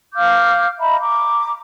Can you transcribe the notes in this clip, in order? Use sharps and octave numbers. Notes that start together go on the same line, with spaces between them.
F5 D6 F6 G6
D#5 E5 A#5 B5
A#5 D6